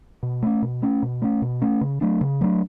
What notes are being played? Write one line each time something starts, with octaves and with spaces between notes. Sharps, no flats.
B2
A3 C#4
B2
A3 C#4
B2
A3 C#4
B2
A3 C#4
C#3
F#3 A3 D4
C#3
F#3 A3 D4